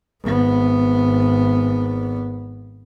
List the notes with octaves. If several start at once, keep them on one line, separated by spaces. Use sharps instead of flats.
G#1 B3